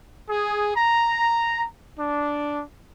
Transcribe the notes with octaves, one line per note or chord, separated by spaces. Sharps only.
G#4
A#5
D4